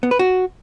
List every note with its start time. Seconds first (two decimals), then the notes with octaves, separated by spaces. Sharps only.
0.03 B3
0.11 B4
0.19 F#4